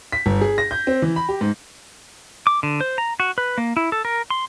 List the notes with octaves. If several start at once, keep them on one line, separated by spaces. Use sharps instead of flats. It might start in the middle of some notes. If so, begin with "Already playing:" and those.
B6
G1
G#4
A#6
G6
C4
E3
B5
G4
G#2
D6
D3
C5
A#5
F#4
B4
A#3
E4
A4
A#4
C6